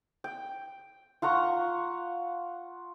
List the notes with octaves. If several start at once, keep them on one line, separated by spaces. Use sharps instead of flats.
G5
F4 F#5 A#5 C#6